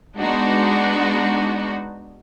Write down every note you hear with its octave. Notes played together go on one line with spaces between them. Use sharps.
G#3 B3 D4 D#4 F#4